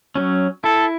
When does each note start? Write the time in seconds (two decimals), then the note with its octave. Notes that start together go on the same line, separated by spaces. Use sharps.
0.15 F#3 C#4
0.64 E4 A4